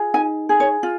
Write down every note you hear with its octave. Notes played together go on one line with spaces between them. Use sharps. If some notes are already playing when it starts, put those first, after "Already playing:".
Already playing: F4 G#4
D#4 G#5
G#4
C#5
F4